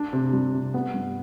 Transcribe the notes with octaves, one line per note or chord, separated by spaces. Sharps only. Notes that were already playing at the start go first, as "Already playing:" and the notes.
Already playing: D4
C3
G3
C3
B3
G2